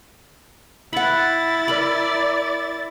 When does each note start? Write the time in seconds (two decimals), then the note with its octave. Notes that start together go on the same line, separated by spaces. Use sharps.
0.93 E4 F#5 B5 A6
1.68 A#4 D5 B5